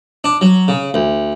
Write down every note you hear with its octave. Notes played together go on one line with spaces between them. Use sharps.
D4
F#3
C#3
D2